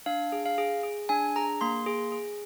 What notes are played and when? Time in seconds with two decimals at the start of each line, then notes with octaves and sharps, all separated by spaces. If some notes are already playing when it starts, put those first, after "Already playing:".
0.06 D4 F5
0.32 G#4
0.46 F5
0.58 G#4
0.83 G#4
1.09 D4 G#5
1.36 G#4 A#5
1.61 A#3 C6
1.80 C6
1.86 G#4
2.12 G#4